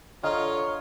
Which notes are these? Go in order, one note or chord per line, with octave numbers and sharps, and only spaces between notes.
D3 F4 C#5 D#5 A#5 F6